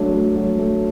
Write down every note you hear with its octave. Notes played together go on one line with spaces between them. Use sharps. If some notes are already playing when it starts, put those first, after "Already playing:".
Already playing: F#3 A3 D4
A3
F#3
A3